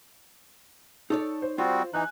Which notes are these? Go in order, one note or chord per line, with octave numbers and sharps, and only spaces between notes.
D#4 A4 C#5 D5
C5
G3 C4 F4 F#4
E3 D#4 G#5 F#6